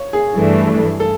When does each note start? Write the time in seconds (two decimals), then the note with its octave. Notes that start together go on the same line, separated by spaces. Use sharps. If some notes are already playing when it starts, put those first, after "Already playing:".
Already playing: C#5
0.13 G#4
0.35 G2 E3 A3 D4
1.00 A4